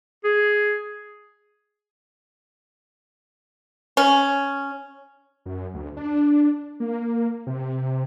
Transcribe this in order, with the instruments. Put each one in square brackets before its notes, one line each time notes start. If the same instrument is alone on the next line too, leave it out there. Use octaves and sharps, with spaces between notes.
[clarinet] G#4
[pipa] C#4
[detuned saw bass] F#2
D2
D4
A#3
C3